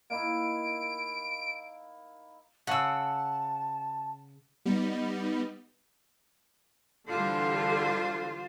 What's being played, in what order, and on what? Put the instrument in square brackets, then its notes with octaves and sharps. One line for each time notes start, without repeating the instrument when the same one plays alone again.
[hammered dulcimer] A#3 D#4 E4 [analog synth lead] D7
[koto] C#3 [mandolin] F#5 E6 [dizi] A5
[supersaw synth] G3 B3 D#4
[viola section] D3 E3 G3 [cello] F4 C5